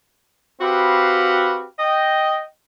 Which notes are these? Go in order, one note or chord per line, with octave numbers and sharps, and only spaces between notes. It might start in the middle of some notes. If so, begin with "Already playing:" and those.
C4 F#4 G4 B4 F5 B5
D#5 G5